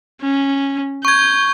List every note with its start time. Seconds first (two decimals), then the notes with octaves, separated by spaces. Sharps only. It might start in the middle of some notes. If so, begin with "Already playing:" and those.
0.22 C#4
1.05 C#6 G6 G#6